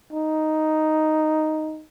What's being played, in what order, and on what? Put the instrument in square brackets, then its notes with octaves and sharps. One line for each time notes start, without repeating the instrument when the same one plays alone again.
[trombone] D#4